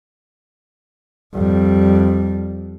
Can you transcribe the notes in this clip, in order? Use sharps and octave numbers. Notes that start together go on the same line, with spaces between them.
F2 G3